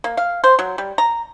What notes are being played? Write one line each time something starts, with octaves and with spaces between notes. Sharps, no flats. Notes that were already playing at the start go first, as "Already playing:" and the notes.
A#3
F5
C5
F#3
G3
A#5